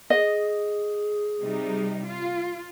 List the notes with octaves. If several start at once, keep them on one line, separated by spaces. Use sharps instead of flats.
G#4 D#5
C3 G3 D#4
F4